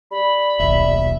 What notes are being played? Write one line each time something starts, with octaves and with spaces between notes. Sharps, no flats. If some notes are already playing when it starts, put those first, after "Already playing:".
G3 B5
D#1 B1 E5